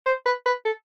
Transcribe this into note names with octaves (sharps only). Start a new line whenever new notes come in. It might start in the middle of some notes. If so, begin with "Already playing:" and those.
C5
B4
B4
A4